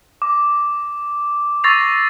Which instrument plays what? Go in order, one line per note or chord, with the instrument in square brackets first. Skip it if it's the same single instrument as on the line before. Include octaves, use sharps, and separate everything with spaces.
[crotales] D6
C#6 E6 A6 A#6 C7 F7